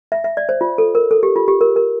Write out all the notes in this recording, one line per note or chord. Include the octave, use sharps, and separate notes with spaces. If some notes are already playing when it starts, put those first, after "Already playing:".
E5
E5
D5
C5
F4
A4
A#4
A4
G4
F4
G4
A#4
A#4